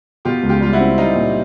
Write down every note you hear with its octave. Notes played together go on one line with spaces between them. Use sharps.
B2 F4 G4
C#2
F4 G4
G3 F4
E4 F#4
C4
G3 D#4 F4
A#2